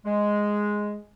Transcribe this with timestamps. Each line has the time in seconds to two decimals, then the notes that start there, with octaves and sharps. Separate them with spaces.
0.06 G#3